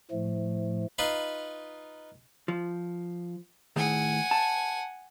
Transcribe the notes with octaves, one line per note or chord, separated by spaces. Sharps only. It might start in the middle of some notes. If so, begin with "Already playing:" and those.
A2 F3 A3
D#4 F4 B4 B5 C6
F3
A2 D#3 G#4 F#5 G#5
A5